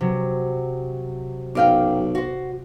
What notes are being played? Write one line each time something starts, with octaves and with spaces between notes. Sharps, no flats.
C3 F#3
B1 F#2 F5 G5 D6
F#4 C5